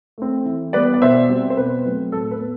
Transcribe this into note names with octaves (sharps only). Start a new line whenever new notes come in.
A3 C4
E3
G3 B3 B4 D5
D5
B2 C5 E5
G3 C4
C5
B2 B4
F#3 A3 C4
A2 A4
B4
B3